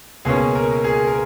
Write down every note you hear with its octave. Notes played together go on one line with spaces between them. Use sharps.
C#2 B2 A#3 C#4 G#4
A#4
G#4
A#4